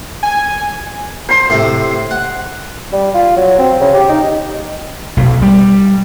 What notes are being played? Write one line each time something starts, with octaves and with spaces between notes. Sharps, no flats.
G#5
C5 C6
A2 C3
F#5
G3
F4
F#3
C4
C#3
G4
D#4
B1
G3